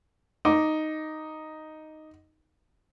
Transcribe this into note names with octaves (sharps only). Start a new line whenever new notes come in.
D#4 D6